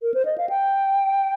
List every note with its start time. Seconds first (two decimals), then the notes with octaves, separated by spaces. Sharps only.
0.02 A#4
0.14 C5
0.25 D#5
0.38 F5
0.49 G5